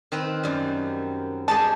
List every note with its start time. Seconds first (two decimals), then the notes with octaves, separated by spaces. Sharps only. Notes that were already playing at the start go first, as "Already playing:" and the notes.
0.12 D#3 C4 B4
0.43 F#2 G3
1.48 G#3 G4 G#4 A5